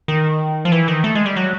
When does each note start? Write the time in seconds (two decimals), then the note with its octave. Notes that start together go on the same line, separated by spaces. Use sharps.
0.08 D#3
0.65 F3
0.72 E3
0.88 D#3
1.04 A3
1.15 G#3
1.26 G3
1.36 F#3